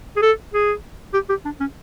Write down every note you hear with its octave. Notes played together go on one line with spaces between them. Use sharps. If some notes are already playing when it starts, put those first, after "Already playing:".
G#4
A4
G#4
G4
G4
D4
C#4